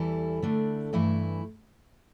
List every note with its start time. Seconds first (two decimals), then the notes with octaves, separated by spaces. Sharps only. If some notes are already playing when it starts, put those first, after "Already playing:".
Already playing: E2 E3 G3 E4 A4
0.42 D3 A3 D4
0.93 G2 E3 A3 E4